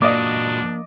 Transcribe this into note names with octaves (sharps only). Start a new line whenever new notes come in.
A#2 F#3 A#3 D4 D5 D#5